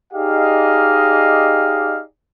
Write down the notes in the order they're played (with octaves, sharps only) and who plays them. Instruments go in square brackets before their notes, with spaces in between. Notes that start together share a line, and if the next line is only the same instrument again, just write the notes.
[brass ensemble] D#4 G4 G#4 D5 D#5 F5